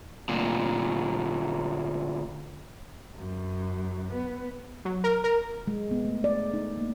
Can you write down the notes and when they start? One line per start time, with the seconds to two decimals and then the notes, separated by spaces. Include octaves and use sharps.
0.29 D2 A#2
3.16 F#2
4.14 B3
4.85 F#3
5.04 A#4
5.24 A#4
5.68 G#3
5.91 B3
6.05 A3
6.24 D5
6.54 D#4
6.77 A#3